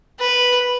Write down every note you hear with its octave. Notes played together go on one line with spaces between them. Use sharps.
B4